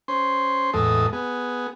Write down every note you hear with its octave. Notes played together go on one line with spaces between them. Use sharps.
C#4 C5 C6
E2 A2 G#3 A4 D#6
B3 G#4